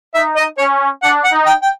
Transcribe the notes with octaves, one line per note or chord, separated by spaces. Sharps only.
D#4 E5
D#5
C#4 C#5
D4 F#5
F#5
D#4
G5
G5